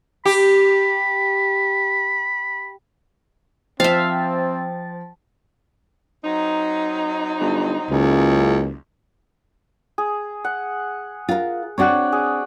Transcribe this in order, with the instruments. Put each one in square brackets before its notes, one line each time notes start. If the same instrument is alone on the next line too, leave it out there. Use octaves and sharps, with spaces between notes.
[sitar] G4 [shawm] B5
[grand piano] F3 [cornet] C4 [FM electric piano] C5 G5 A6 [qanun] E5 F5
[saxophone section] F#3 C4 D#4
[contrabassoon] G1
[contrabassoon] F#1 [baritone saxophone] C#2
[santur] G#4
F#5
[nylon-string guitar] F4 A#4
[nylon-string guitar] C4 D4 F#4 [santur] C#5 D5 F#5
[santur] G#4